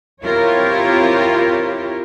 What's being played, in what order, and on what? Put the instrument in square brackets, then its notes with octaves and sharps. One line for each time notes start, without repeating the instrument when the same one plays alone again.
[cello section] C4 E4 F4 G4 A#4 C#5